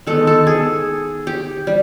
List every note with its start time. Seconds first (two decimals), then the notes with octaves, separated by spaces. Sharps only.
0.07 D#3 G#3 B3 A4
0.27 A4
0.47 G#4
1.27 G4
1.67 G3